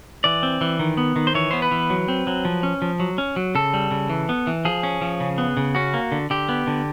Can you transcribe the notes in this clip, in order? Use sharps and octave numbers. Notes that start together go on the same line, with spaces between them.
E3 D5
C4
E3
D#3
B3
D#3
C5
E3 C#5
B3 C5
B4
E3
F#3
C4
F#3
F3
C#4
F3
F#3
C#4
F#3
C#3 A4
G3
C#3
E3
B3
E3
F3 G#4
C#4
F3
C#3
B3
C#3
C#4 F#4
A#3
D3
D3 G4
B3
D3